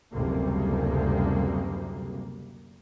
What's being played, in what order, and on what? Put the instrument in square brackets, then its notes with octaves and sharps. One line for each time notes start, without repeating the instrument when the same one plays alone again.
[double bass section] F#1 D2 C3 G3 A#3